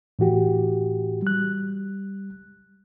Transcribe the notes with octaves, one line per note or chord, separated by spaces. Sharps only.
A2 E3 F#4 G4
G3 F#6